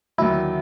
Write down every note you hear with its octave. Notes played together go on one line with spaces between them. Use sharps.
D#2 D3 F#3 E4